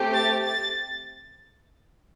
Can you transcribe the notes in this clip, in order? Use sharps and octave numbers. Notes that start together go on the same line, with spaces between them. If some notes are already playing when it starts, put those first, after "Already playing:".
Already playing: A3 C4 G4
A6
A6